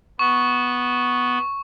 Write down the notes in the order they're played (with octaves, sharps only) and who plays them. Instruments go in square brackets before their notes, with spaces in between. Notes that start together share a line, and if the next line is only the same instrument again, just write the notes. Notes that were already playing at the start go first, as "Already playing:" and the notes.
[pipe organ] B3 [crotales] C#6